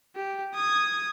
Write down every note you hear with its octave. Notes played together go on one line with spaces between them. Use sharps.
G4
D#6 G#6